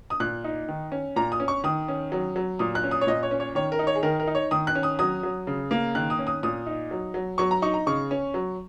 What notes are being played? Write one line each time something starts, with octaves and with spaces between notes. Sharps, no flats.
D#6
A#2 F#6
D#4
D#3
C#4
A#2 A#5
D#6
C#4
C#6
D#3 D#6
C#4
F#3
F#3
A#2 D#6
F#6
C#4
D#6
C#5
A#2 D#5
C#5
C#4
C#5
D#3 C#5
A#4
D#4
C#5
G#4
D#3 A#4
A#4
D#4
C#5
D#3 D#6
F#6
C#4
D#6
F#3 D#6
F#3
C#3
A#3
D#3 F#6
D#6
C#4
D#6
A#2 D#6
D#4
F#3
F#3
F#3 C#6
A#5
D#4 C#6
A#5
C#3 C#6
C#4
F#3